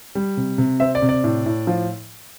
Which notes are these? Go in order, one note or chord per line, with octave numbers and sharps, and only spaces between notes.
G3
C3
C3
C4 E5
D5
C3
D5
A2
A2
F3